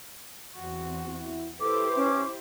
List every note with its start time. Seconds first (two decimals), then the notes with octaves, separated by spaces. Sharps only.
0.59 E2 C4 F#4
1.08 E4
1.60 E4 G4 A4 B4 C5 D6
1.96 C#4